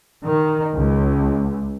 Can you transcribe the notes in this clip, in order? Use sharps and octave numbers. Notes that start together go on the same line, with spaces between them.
D#3
C#2